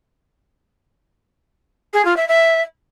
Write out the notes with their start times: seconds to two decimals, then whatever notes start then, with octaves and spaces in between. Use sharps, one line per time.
1.93 G#4
2.05 F4
2.17 E5
2.28 E5